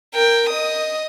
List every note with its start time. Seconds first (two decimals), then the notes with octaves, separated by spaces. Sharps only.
0.14 A#4 G5
0.49 D#5 D#6